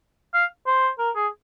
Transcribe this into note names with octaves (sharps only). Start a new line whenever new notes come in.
F5
C5
A#4
G#4